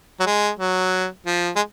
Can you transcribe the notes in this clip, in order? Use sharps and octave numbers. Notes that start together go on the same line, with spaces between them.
F#3
G#3
F#3
F3
G#3